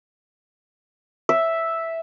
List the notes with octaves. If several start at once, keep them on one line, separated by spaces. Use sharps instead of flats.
E5